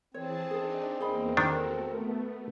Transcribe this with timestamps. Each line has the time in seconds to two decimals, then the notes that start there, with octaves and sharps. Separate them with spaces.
0.14 E3 C4 G#4 C#5 A5
0.51 D4 D#4 G#4 A4
1.00 E2 A#3 G#4 D#5 B5
1.37 D#3 D4 F#4 A4 A#4
1.72 A3 B3